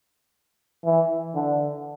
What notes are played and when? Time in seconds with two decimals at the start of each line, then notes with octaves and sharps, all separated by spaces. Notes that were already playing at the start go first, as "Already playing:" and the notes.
0.85 E3
1.35 D3